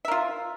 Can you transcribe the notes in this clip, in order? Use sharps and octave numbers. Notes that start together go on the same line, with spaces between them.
F4 A#4 E5